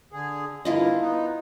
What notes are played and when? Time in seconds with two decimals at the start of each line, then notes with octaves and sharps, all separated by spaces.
0.12 D3 G#4
0.65 G2 D3 A#3 E4 F4 D#5
1.01 B3 D#4